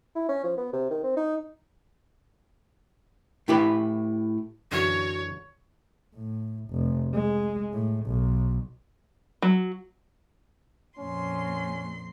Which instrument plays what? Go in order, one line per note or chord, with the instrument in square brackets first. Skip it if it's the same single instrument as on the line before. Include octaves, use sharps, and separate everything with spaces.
[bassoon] E4
C#4
F3
B3
C3
D#3
C4
D#4
[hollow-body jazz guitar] A2 E4 G4 B4
[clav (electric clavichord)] F#2 D3 E3 [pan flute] F#4 [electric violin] C#5
[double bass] A2
F1
G#3
A2
B1
[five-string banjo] F#3
[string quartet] F2 A#2 C6 [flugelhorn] C#4